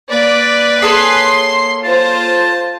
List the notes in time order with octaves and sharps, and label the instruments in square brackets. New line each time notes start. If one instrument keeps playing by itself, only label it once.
[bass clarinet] A#3 [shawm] B4 [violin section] D5
[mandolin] G#4 A4 C#5 [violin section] C6 C7
[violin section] F4 C5 [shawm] A5